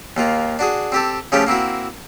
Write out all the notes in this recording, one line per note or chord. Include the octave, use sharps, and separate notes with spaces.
D#2 A#3 F4
D4 F#4 G#4
C4 G4 A4
C#3 F3 A3 G4 C#5 G5
A#3 C4 E4 F#4